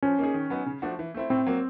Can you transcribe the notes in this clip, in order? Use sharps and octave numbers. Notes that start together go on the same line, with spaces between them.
F3 C#4
A#3 D#4 G#4
D#3
F#3 B3 D#4
C#3
F3 A3 D4 F#4
E3
A3 C4 E4
A2 C4
F#3 A#3